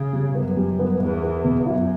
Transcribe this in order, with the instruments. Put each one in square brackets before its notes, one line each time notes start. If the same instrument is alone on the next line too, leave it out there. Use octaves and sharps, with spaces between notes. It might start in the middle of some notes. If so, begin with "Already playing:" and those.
Already playing: [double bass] C#3
[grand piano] G3
[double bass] F#2 [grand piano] B3
[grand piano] G3
B3
[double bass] E2 [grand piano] B3
[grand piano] B3
B2
[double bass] F#2 [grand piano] E4